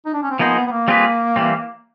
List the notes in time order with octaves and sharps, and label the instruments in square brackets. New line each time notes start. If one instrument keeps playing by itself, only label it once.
[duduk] D#4
D4
C#4
C4
[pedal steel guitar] F3 A#3 D#4 G#4 C5 [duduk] B3
[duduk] B3
B3
A#3
[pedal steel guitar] G3 C4 F4 G#4 B4
E3 G3 C4